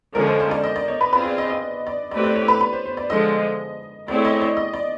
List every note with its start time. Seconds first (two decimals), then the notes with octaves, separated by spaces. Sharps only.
0.15 D3 F3 G#3 C#4 A#4
0.27 C5
0.40 C5
0.51 D5
0.64 D#5
0.76 D5
0.88 C#5
1.01 B4
1.13 C4 F4 G#4 B4
1.25 D5
1.38 D#5
1.50 D#5
1.87 D5
2.11 A3 C4 E4 G4 B4 D5
2.23 D5
2.35 C#5
2.48 B4
2.61 B4
2.73 C5
2.86 C5
2.97 D5
3.10 D3 F3 G#3 D#5
4.08 A3 C4 E4 G#4 C#5 D5
4.25 D#5
4.41 D5
4.57 D#5
4.74 D5